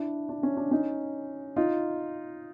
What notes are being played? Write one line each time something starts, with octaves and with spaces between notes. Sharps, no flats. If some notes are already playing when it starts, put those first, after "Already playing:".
Already playing: D4 E4
D4
C#4
D4
C#4 D#4
D#4 F4